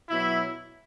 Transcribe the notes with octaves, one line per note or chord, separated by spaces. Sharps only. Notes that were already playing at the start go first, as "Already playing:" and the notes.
B2 F#3 E4